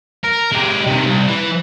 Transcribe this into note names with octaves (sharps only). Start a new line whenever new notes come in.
A#4
G#3 G4
C3 D#3
C2
E3